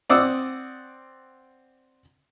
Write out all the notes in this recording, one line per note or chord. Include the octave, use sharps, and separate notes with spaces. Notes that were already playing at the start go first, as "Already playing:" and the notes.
C4 D5 F#5 D#6 E6